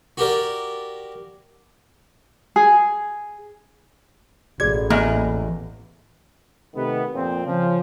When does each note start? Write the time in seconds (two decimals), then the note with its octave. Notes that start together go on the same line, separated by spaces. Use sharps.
0.17 F#4 G4 A#4 D5
2.56 G#4
4.60 A1 F#4 G#4 D5 G#6
4.90 E2 A#3 D#5 E5 G#5
6.75 C3 D#3 A3 B3
7.14 F2 A#2 C4
7.45 C#3 F3